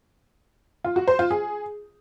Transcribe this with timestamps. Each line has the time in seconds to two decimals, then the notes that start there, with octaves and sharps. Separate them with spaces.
0.85 F4
0.96 F#4
1.08 C5
1.19 F4
1.31 G#4